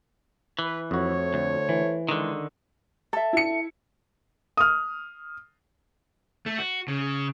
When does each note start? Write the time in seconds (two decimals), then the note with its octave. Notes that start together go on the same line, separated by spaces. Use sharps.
0.59 E3 B4
0.91 F2 A3 F#4 C5 C#5
1.34 D2
1.69 E3
2.09 D3 D#3 G#3
3.13 A4 E5
3.33 E4 C#7
4.57 D#6 F6
6.46 A3
6.58 F#4
6.88 C#3